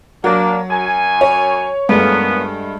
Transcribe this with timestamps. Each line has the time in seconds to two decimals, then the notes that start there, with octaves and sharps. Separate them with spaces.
0.24 F#3 A#3 D4
0.70 F#2 G#5
1.21 C#5
1.89 G2 A#2 G#3 A3 B3 C#4